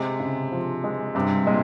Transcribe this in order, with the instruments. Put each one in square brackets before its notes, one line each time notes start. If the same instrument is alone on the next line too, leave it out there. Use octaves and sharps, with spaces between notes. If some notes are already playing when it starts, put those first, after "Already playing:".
Already playing: [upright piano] C3 [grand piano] G#3
[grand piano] C#3
F3
G#3
[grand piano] G2 [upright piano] C3
[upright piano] A#2 [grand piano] G#3